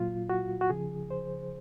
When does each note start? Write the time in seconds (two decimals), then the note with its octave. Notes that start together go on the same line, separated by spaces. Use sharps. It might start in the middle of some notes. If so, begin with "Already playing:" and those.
Already playing: A#2 F#3 F4
0.29 F#4
0.61 F#4
0.70 C#3 F3 G#4
1.11 C5